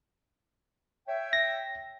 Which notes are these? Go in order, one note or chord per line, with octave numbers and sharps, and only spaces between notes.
C#5 E5 G5
A#6